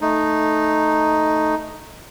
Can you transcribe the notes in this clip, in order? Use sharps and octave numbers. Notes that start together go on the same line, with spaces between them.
A3 D#4